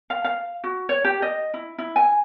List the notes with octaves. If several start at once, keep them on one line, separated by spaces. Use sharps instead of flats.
F5
F5
F#4
C#5
G4
D#5
E4
E4
G#5